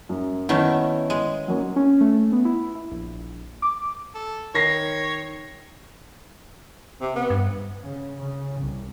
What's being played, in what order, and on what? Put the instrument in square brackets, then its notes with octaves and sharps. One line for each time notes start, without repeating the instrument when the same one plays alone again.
[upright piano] F#2
[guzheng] D#3 A3 C#4 [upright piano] B3 E4 F#5
[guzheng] G#3
[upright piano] F#3 A#3 C#4
[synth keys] C#4
A3
B3
E4
E4
A#1
D6
[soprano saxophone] A4
[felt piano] D#3 A#6 C7 [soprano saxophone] C#5
[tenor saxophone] C3
B3
[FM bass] G2
[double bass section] C#3
C#3
C2